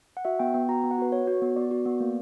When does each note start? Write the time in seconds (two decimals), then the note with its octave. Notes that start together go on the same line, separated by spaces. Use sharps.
0.17 F#5
0.25 F#4 E5
0.39 B3 G5
0.54 B3 G5
0.69 F#4 A#5
0.83 B3
0.91 F#5
0.98 F#4 B4
1.12 F#4 C#5
1.27 F#4
1.42 B3
1.56 B3 D5
1.71 F#4
1.86 B3
2.00 A#3